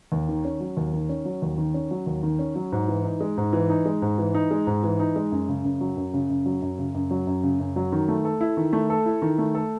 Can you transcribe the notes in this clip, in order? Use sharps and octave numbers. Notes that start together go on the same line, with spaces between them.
D#2
D#3
C#4
F#3
D#2
D#3
C#4
F#3
D#2
D#3
C#4
F#3
D#2
D#3
C#4
F#3
G#2
E3
D#4
G#3
G#2
E3
D#4
G#3
G#2
E3
D#4
G#3
G#2
E3
D#4
G#3
F#2
C#3
F#2
F#3
F#2
C#3
F#2
F#3
F#2
C#3
F#2
F#3
F#2
C#3
F#2
F#3
D#3
A3
A4
E4
D#3
A3
A4
E4
D#3
A3
A4